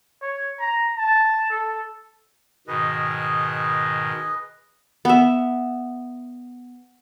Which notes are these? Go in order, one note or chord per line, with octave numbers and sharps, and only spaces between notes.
C#5
A#5
A5
A4
G#2 B2 D#3 G#4 B4 D#5
B3 E5